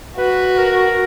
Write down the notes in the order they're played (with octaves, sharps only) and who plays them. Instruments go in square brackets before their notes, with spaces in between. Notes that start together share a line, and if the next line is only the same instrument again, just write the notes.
[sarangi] F#4 [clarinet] B4
[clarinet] A#4